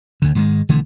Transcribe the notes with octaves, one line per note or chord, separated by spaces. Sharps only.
D2 D3
G#2 D#3 G#3
B1 D3 E3 A3